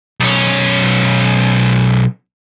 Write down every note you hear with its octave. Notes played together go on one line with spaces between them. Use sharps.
B1 C#4